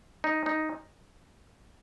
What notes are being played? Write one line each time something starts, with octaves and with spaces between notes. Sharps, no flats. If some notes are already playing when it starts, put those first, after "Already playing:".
D#4
D#4